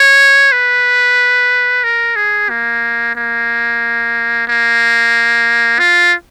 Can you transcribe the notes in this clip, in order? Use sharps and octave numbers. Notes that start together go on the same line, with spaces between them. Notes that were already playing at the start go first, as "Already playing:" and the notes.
Already playing: C#5
B4
A#4
G#4
A#3
A#3
A#3
F4